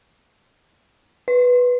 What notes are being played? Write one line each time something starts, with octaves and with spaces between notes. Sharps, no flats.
B4